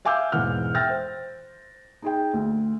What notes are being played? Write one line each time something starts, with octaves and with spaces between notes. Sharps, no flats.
E5 F5 G#5 D6 E6 G6
E1 G#2 E3 F#5 F6
E5 G5 E6 F6 A6 A#6
C5
D#4 G#4 G5
D2